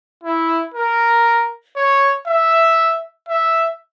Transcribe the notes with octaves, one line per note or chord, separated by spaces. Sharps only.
E4
A#4
C#5
E5
E5